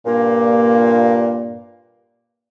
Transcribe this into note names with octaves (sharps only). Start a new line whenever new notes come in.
G2 A#2 A#3